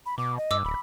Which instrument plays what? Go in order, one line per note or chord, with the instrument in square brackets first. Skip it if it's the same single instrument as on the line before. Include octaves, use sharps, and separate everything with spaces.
[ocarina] B5
[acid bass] B2 [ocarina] D6
[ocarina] D#5
[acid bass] G2 [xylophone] D6 E6
[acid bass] D1 [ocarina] B5